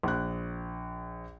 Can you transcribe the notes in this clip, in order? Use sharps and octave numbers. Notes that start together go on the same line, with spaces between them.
A#1 F#6